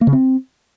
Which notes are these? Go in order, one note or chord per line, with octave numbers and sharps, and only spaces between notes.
A#3
C#3
C4